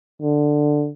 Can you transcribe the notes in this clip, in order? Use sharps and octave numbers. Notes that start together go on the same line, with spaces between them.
D3